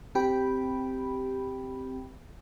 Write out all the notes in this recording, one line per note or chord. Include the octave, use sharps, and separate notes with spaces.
C4 G4 G5 B5